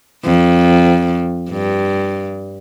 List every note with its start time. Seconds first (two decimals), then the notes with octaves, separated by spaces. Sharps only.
0.25 F2
1.50 G2